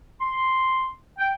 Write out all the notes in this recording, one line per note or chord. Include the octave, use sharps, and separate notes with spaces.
C6
G5